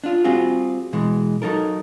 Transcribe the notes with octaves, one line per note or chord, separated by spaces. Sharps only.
D4 F4
G3 C4 F4 F#4 G#4
B2 E3 G#3
F#3 D#4 A4 A#4